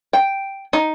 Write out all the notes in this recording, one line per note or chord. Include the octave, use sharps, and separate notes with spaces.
G5
D#4